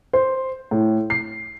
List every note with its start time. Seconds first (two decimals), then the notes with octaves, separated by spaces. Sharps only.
0.13 C5
0.71 A2
1.10 C7